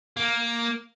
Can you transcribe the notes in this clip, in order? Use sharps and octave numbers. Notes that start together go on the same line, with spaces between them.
A#3